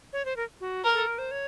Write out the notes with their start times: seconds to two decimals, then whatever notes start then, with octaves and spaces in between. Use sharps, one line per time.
0.13 C#5
0.25 C5
0.36 A#4
0.60 F#4
0.84 A#4
0.94 A4
1.07 A#4
1.18 C5
1.31 C#5